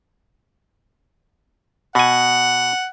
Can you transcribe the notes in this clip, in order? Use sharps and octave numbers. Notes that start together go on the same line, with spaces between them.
B2 F#5 G#5